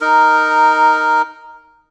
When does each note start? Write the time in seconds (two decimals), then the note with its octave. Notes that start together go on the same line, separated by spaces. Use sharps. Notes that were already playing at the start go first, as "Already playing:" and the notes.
0.01 D#4 A#4